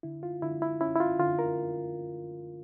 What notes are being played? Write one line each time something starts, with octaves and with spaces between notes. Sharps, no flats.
D3 E4
F4
D3 E4
E4
C#4 E4
E4
F4
D3 F4
A#4